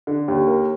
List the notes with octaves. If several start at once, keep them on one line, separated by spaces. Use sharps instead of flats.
D3
D#2
A#3